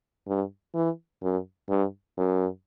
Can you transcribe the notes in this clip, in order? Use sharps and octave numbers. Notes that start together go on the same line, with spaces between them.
G2
E3
F#2
G2
F#2